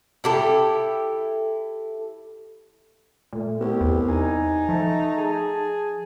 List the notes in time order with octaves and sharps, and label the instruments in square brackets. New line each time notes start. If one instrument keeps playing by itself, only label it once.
[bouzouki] E4 G4 A4
[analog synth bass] A#2 [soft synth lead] A3
[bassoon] C2 [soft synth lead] B3 [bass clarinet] G4
[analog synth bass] E2
[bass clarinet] D#4 [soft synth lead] G#5
[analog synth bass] F3 [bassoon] A3 [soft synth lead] A5
[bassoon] G#4